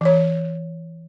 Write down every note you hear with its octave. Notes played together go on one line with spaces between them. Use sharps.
E3 C#5